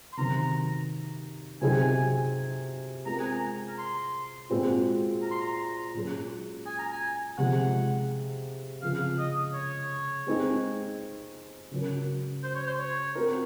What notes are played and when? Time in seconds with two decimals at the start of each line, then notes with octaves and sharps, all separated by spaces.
0.13 C6
0.17 C3 D#3 F#3 C4 A#5
1.62 C3 F#3 C4 D#4 G#4 G#5
3.06 G#3 C4 F4 A#4 A#5
3.20 G#5
3.33 A#5
3.68 A#5
3.78 C6
4.50 A#2 G#3 C4 F#4
5.22 A#5
5.31 C6
5.41 A#5
5.94 A#2 F#3 C#4 G#4
6.66 G#5
6.79 A#5
6.92 G#5
7.38 C3 F3 G#3 F#5
8.82 C#3 F3 C4 F4 G#4 F5
9.19 D#5
9.54 C#5
10.27 G#3 C4 D#4 G#4
11.71 C#3 F#3 C#4 F#4 A#4
12.43 C5
12.55 C#5
12.67 C5
12.79 C#5
13.15 C4 F#4 A#4